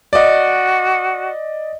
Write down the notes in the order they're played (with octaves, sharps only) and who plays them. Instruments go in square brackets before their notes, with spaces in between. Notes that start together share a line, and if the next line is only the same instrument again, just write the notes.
[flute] F#4 [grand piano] D5 D#5